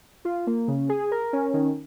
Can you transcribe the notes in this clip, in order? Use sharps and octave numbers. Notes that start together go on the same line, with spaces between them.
F4
A#3
C#3
G#4
A#4
C#4
D#3